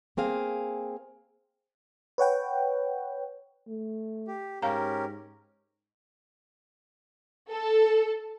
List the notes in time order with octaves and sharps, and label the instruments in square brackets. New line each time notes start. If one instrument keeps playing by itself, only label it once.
[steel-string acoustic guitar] A#3 C4 G#4 F5
[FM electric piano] B4 C#5 F#5 G5
[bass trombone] A3
[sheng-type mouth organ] G4
[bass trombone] G#2 [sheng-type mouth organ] C#4 G4 A#4 [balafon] F5 A#5
[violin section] A4